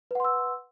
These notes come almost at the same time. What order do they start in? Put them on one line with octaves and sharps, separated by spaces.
B4 F#5 C6 E6